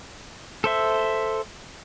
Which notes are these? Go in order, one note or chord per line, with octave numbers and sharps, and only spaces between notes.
A4 C5 E5